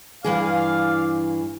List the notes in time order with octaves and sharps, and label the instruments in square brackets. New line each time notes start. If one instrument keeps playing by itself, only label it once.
[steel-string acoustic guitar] G2 E3 G#4 [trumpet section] D5 F5